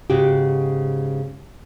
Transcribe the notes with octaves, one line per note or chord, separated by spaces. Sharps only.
G#2 C#3 F#4 G4